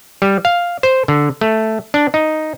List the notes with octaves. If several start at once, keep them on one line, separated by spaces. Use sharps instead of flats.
G3
F5
C5
D3
A3
D4
D#4